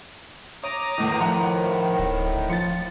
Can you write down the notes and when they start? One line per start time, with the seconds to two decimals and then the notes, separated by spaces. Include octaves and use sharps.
0.64 C#5 A#5 D6 D#6
0.98 E2 A2 D#3
1.20 A2 D#3 F3 F#5 A#5
1.99 D1
2.50 F3 A6 C#7